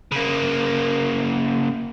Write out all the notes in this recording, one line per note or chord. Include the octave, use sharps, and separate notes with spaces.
C#3 A#3